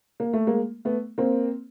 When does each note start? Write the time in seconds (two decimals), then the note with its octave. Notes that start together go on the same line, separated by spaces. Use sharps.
0.20 A#3
0.33 A3
0.47 G#3 A#3
0.85 A3 B3
1.18 A#3 C4